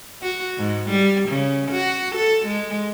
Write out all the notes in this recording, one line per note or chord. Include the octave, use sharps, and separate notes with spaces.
F#4
G#2
G3
C#3
F#4
A4
G#3